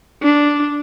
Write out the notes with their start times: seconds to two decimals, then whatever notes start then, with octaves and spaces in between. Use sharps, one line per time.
0.23 D4